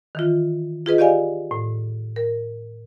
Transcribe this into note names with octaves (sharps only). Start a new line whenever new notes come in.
D#3 E3 F4
F4 G#4 B4 D#5
G4 D5 D#5 F5 G#5
A2
A#4